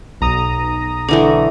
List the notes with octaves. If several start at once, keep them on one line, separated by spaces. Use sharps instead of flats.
B1 A#5 D#6
D3 E3 A3 D4